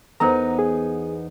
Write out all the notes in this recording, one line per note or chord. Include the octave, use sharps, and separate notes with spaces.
E2 B3 D#4 A4 A#4 C5 A#5
G#4